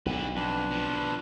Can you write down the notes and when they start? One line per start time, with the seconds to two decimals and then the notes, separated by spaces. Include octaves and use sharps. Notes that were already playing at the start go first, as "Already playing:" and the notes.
0.06 B1 D3 B4
0.36 F2 D4 B4
0.71 B2 F3